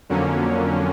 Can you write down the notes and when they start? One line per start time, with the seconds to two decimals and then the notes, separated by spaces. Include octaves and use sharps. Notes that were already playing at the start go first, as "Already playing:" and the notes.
0.09 F2 D3 F#3 A#3 C#4